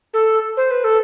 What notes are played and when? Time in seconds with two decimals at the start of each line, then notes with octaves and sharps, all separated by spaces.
0.13 A4
0.57 C5
0.71 B4
0.84 A4